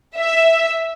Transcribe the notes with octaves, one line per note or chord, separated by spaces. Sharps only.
E5